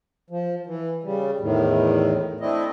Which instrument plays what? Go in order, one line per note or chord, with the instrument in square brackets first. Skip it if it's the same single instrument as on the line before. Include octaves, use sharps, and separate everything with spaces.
[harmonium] F3
E3
C#3 G3
E2 A2 D#3
A3 C4 D4 E4 D#5